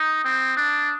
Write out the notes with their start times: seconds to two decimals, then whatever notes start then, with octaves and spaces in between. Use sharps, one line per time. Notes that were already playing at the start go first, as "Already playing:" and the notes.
Already playing: D#4 D#6
0.24 C4
0.57 D4